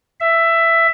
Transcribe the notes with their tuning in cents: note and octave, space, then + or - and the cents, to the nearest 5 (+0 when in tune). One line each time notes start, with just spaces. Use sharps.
E5 +10